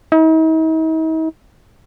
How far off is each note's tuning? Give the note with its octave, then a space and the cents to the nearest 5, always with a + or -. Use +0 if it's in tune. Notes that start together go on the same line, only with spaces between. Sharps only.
D#4 +45